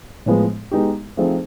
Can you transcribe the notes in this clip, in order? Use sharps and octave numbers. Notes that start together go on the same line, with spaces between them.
A2 F3 G#3 B3
G#3 B3 D#4 G4
F3 A3 C4 D#4 G#4